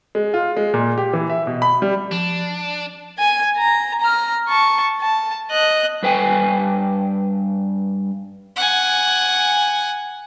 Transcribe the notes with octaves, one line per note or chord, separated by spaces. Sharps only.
G#3
F4
G#3
A#2
G4
E3
E5
B2
B5
G3
F3 D4
G#5 G#6
A#5
A#5 F6
A5 C#6
A5
D#5 F#6
G2 B4 G5 G#5
F#5 G#5